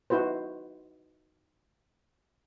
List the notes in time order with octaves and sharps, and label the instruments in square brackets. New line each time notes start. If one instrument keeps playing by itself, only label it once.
[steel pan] D#4 E4 F#4 B4 C5